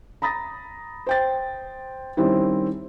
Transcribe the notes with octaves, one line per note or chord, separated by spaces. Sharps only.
A#5 B5 D#6 A6 A#6
C5 G5 A6
D#3 G3 C4 C#4 E4